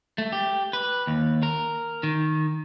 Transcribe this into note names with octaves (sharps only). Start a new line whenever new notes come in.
A3
G4
B4
D#2
A#4
D#3